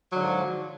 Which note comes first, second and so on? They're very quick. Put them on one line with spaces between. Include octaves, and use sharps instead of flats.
F#3 D3 G#2 F3